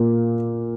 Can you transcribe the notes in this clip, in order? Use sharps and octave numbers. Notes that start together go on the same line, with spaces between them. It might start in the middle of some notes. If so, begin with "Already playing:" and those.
Already playing: A#2 A#3